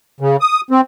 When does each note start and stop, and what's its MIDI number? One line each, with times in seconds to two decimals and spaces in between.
0.20 0.36 49
0.41 0.61 87
0.71 0.81 60